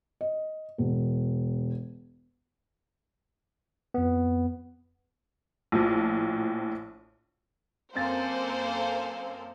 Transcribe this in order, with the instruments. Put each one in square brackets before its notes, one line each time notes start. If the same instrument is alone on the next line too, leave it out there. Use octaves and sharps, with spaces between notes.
[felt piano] D#5
E1
[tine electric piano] F2 B3
[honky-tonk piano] A#1 A2 F3
[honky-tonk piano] F#2 C4 A6 [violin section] A#3 A4 C5 [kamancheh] F5 G#5